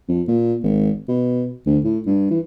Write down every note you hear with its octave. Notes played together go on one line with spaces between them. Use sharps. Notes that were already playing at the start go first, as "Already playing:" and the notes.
F2
A#2
G#1
B2
D2
A2
G2
E3